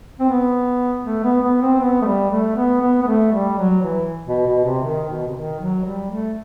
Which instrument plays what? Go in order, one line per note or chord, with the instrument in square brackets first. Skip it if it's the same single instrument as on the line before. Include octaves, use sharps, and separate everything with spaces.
[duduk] C4
B3
A3
B3
B3
C4
C4
B3
A3
G3
A3
B3
B3
B3
A3
G3
F#3
E3
B2
B2
C3
D#3
B2
C3
D#3
F#3
G3
A3